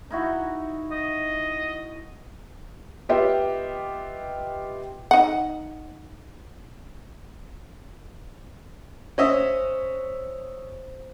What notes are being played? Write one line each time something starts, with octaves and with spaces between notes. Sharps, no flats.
D#4 E4 F#4
D#5
B3 F4 G4 D#5 E5
D#4 F#5
C#4 C5 D#5 E5